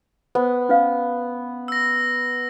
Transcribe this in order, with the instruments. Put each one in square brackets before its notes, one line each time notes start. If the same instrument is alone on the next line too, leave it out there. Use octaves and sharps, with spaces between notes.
[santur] B3 [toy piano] C5
[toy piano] C#4 B4 F5
[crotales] E6 A#6